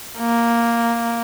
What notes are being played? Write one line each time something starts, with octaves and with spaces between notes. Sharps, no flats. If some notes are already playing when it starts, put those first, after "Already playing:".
A#3